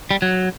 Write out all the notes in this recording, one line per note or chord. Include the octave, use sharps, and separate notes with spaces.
G3
F#3